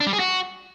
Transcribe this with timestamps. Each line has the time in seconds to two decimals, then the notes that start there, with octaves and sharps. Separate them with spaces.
0.01 D4
0.07 G3
0.13 G#4
0.19 F#4